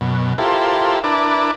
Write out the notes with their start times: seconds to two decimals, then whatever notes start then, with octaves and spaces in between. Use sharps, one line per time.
0.01 F#2 B2
0.38 E4 F4 G4 A4 A#4 C5
1.04 D4 E4 A#4 B4 A5 D6